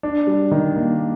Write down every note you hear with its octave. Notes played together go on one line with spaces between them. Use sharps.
D4
G3
D#3
A#3